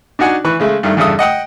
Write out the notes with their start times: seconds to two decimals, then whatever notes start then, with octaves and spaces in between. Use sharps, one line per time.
0.19 D4 D#4 F#4 F#5 G#5
0.44 E3 B4 C#6 F#6
0.60 C#3 G#3 A3
0.83 G2 D#3 A3
0.97 E2 G2 C#3 A4 E5 D#6
1.19 D#5 F#5 G5 D#6